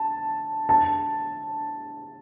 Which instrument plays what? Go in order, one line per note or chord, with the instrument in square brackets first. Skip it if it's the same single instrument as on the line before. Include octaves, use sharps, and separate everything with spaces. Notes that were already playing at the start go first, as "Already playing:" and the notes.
Already playing: [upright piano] A5
A5